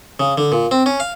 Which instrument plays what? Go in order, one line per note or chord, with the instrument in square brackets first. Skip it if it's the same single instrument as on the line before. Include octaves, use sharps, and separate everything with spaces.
[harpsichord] C#3
D3
A#2
C4
C#4
F5